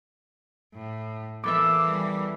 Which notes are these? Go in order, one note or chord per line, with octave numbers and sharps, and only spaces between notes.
A2
E2 E3 A#3 A4 E5 D6
G3